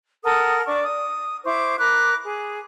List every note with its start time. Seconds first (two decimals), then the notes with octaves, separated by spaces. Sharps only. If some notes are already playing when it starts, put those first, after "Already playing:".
0.24 A4 A#4 F#5 D#6
0.66 D4 D5 C#6
0.84 D#6
1.45 E4 C5 C#6 D6
1.79 A#4 B5 D6 F#6
2.24 G#4